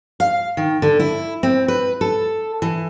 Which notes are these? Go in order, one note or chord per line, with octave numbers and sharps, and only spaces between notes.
F5
D#3
D3
E4
C4
B4
A4
E3